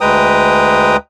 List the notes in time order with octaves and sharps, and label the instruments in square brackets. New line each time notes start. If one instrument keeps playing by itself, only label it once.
[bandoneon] D2 G#3 B4 G5 A#5 D#6